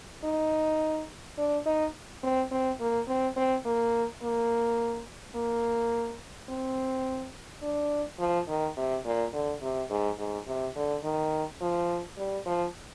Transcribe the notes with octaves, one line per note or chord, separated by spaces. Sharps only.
D#4
D4
D#4
C4
C4
A#3
C4
C4
A#3
A#3
A#3
C4
D4
F3
D#3
C3
A#2
D3
C3
G#2
G#2
C3
D3
D#3
F3
G3
F3